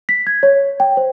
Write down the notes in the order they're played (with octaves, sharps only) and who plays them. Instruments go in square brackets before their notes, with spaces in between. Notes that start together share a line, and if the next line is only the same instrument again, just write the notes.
[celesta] B6
G#6
C#5
G5
C5